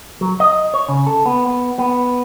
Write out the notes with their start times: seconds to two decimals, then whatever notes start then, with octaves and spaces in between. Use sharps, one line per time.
0.21 F#3
0.40 D#5
0.74 C#5
0.88 C#3
1.07 A4
1.26 B3
1.46 B3
1.79 B3